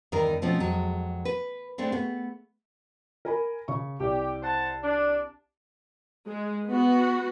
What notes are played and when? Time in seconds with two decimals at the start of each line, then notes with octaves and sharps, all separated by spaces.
0.12 E2 G2 D#3 D#4 A#4
0.42 B2 F3 A3 C4 C#4
0.60 F2 F#3 G#3
1.25 B4
1.78 G#3 A3 C4 D4
1.92 A3 B3
3.25 A#4 G#5 B5
3.68 C#3 C#6
4.00 C2 G4 D5
4.42 C5 F#5 A5
4.82 D4
6.26 G#3
6.67 B3 F#4